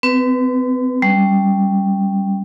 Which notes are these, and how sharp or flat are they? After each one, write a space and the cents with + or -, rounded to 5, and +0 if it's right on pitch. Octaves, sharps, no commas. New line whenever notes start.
C4 -40 B4 +0
G3 +0 C#4 +0